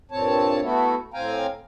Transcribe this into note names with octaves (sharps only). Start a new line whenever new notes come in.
G2 A#2 C4 C#5 A5
A3 B3 E4 F#4 A4
A2 C4 F5 G5 G#5 A#5